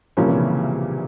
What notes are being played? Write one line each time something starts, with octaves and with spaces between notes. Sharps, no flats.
A#1 A#2 C#3 F3 G3 A#3 C#4
C3 E3
C#3